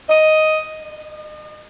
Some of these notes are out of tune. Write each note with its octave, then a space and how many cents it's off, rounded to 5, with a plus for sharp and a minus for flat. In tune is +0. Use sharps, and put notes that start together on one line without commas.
D#5 +5
D#5 -40